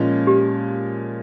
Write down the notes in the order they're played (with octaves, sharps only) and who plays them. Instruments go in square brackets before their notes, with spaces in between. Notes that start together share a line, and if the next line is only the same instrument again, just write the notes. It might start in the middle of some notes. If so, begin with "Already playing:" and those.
Already playing: [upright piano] A#2 F3 G#3 C#4
[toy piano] G4